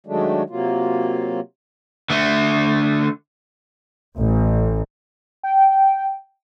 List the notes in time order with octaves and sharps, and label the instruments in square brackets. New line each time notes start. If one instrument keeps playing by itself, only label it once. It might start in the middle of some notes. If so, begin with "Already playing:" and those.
[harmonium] D#3 F#3 G#3 A3 D4
C3 F#3 A#3 F4
[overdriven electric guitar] D3 A3
[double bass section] A1
[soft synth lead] G5